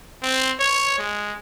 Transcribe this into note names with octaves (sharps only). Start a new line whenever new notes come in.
C4
C#5
G#3